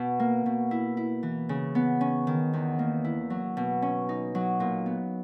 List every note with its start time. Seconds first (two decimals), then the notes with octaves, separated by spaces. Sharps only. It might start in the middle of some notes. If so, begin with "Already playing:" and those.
Already playing: B2
0.20 A#3
0.46 B2
0.71 E4
0.97 E4
1.23 E3
1.49 C#3
1.75 B3
2.01 C#4
2.27 D#3
2.53 E2
2.79 A#3
3.04 E4
3.30 F#3
3.57 B2
3.82 C#4
4.09 D#4
4.35 F#3
4.60 A#2
4.86 B3